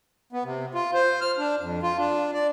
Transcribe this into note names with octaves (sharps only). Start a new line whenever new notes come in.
B3
C3
F4
C5
F6
D4
F2
F4
D4
D5